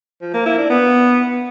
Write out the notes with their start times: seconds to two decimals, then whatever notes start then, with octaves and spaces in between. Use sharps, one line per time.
0.22 F3
0.34 A#3
0.46 E4
0.58 D4
0.70 B3